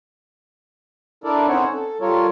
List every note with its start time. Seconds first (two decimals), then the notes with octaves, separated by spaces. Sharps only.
1.24 D4 E4 A4 A#4 D5
1.49 C4 C#4 D#4 C5 C#5 F#5
1.73 A4
2.01 G3 F4 A4 A#4 C#5